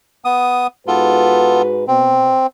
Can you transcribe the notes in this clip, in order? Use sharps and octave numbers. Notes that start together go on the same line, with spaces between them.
B3 D#6
G#2 B3 F4 F#4 A4 B4
B2 C4